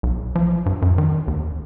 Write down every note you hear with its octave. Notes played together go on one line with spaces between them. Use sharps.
B1
F3
G2
F#2
D#3
D#2